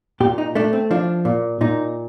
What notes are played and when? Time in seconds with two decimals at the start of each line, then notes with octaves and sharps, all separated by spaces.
0.20 A#2 G4
0.38 D#4
0.55 A3 D4
0.73 C4
0.91 F3 D4
1.25 A#2
1.61 A#2 D#4